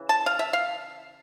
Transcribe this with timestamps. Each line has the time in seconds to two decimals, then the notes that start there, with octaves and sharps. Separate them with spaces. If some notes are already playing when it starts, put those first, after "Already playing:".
Already playing: C#3 E3
0.09 A5
0.26 F5
0.39 E5
0.53 F5